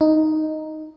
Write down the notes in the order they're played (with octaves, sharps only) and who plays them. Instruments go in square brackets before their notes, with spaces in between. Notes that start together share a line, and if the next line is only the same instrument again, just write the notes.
[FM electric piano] D#4